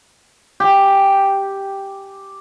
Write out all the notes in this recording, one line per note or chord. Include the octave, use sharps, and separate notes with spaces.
G4 G#5